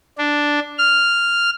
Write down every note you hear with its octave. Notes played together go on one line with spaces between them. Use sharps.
D4
F6